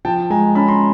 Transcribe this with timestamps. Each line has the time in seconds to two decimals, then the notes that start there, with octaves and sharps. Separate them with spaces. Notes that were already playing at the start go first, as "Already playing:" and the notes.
0.05 F3 G5 A5
0.30 G#3 G#5 A#5
0.55 C#4 A5 B5
0.68 A#5 C6